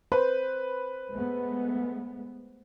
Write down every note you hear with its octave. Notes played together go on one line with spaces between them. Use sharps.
B4 C5
G#3 A3 B3